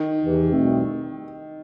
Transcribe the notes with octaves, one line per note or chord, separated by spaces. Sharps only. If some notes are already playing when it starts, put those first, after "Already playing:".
Already playing: D#3
E2 C3 E3
C2 B2 A3 C4